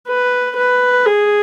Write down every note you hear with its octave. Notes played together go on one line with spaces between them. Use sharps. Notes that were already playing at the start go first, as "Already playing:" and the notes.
B4
B4
G#4